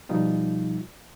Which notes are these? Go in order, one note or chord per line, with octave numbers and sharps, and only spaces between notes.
B2 F3 G3 D#4 F4